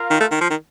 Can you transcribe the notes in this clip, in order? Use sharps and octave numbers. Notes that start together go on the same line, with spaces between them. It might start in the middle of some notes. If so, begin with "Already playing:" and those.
Already playing: F4 A#4 F5
D#3
A3
D#3
F3
D#3